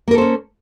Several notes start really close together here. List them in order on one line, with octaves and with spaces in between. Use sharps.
A#3 A#4 A4 C5 C#4